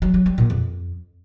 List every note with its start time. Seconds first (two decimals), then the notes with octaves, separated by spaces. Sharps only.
0.02 F#3
0.14 F#3
0.26 G3
0.38 A#2
0.50 F2